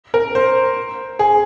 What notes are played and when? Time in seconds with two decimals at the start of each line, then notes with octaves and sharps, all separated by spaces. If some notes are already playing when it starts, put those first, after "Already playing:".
0.14 A#4
0.35 C5
1.19 G#4